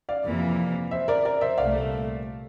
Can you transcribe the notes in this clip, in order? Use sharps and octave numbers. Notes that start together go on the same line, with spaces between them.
D5 F5
F2 C3 E3 A#3
C5 E5
A#4 D5
A#4 D5
C5 E5
C2 A#2 A3 D5 F5